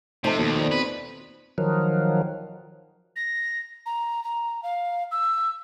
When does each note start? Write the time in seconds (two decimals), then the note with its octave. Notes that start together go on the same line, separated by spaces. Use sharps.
0.24 C3 F3 A3 D#4 C5 D#5 A5
0.38 D#2 B2
0.56 C5 D5
0.71 C4 B4
1.58 D#3 F3 F#3
3.16 A#6
3.86 A#5
4.24 A#5
4.63 F5
5.11 E6